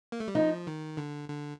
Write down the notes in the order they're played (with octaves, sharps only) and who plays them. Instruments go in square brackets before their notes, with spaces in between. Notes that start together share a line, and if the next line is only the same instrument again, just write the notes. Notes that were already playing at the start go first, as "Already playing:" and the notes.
[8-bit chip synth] A#3
A3
G3
[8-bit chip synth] F3 [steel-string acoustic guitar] D#4
[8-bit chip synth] D#3
D3
D3